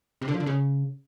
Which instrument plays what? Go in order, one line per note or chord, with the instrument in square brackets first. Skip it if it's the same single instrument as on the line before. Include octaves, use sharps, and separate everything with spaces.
[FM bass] C3
D3
F3
D3
C#3